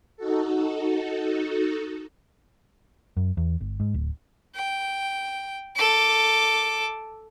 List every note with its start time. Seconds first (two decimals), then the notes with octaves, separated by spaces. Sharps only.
0.17 D#4 F#4 A4
3.17 F#2
3.37 E2
3.61 G1
3.80 G#2
3.94 D1
4.56 G5
5.76 A4 D6